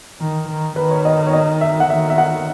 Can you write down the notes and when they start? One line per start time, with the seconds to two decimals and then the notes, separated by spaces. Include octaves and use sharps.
0.20 D#3
0.49 D#3
0.76 D#3 B4
0.91 C#5
1.05 D#5
1.27 C#5
1.33 D#5
1.61 E5
1.80 F#5
1.90 D#3 E5
2.10 E5
2.18 F#5